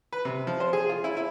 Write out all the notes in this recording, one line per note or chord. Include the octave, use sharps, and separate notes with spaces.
B4
C3
F3
C5
G#4
F4
E4
E4